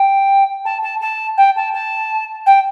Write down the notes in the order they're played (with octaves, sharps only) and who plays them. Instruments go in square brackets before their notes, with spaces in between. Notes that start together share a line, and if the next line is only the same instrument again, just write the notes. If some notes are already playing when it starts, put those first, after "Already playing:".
Already playing: [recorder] G5
A5
A5
A5
G5
A5
A5
G5